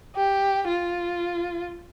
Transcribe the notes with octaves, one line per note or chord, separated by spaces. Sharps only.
G4
F4